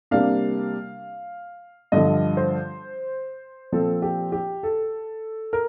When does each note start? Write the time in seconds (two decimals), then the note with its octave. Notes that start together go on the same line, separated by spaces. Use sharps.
0.11 C3 G3 A#3 D4 F5
1.92 G2 D3 F3 D#5
2.37 C5
3.72 A#2 F3 C4 A4
4.02 G4
4.32 G4
4.63 A4
5.53 A#4